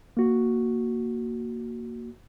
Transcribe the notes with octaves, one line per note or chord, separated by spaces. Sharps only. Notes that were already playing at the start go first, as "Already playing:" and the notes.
A#3 F#4